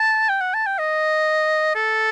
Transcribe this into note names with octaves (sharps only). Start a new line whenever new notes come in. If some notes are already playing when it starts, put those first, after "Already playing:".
Already playing: A5
G5
F#5
A5
G5
D#5
A4